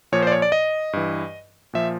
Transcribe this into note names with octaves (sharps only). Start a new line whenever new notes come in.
A#2 F3 C#5
C5
D5
C#5
D5
D#5
G2 E3
A#2 F3 E5